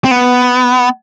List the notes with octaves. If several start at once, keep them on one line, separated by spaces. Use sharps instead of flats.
C4
B3